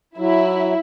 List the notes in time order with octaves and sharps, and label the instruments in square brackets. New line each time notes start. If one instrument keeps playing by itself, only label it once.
[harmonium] F#3 [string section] E4